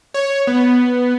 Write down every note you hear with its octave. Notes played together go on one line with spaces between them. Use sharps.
C#5
B3